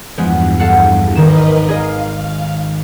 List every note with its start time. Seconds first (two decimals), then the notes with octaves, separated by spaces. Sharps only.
0.18 E2 G2 F3 G#3 B3
0.60 A4 F5 F#5
1.15 G#1 D#3 A#4 B4 D#5 E7
1.67 D#4 G#4 D#5 F5